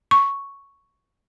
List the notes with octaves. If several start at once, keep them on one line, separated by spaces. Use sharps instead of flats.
C#6